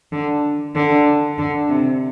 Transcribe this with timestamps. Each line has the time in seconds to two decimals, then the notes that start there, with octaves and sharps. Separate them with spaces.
0.12 D3
0.76 D3
1.38 D3
1.69 C3